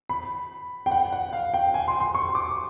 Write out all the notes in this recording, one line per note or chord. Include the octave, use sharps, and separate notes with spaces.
B5
G5
F#5
F#5
F5
G5
G#5
C6
C6
C#6
D6